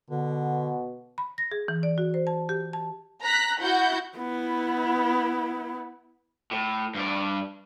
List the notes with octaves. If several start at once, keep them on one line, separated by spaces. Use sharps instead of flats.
B2 D3
B5
A#6
G#4
E3
D5
F#4
C5
A5
G4
A5
A#5 F#6 B6
E4 F#4 F#5 G6
B3 E4
A2
G2 D5